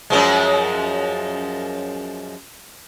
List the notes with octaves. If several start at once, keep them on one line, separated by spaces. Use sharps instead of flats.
F#2 F3 G#3